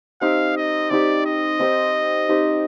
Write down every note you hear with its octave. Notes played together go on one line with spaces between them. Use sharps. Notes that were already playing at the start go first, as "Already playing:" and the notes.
C4 D#4 G4 F5
D#5
C4 D#4 G4 D5
D#5
C4 D#4 G4 C5
C4 D#4 G4 C5